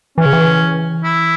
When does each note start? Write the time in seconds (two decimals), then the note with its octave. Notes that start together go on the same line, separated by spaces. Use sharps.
0.18 E3 C#4
0.26 C#3
0.33 E3
1.04 E4